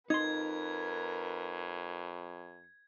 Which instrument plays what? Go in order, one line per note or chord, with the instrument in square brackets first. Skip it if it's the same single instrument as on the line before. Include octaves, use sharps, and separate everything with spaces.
[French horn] F2 [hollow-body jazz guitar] D#4 C6 [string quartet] A#4 B4 [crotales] G#6